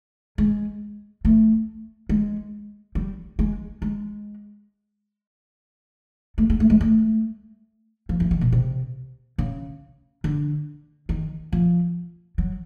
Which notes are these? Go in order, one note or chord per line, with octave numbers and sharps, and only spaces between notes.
G#3
A3
G#3
G3
G#3
G#3
A3
G#3
A3
G#3
A3
F3
E3
D#3
B2
C3
C#3
D3
D#3
F3
F#3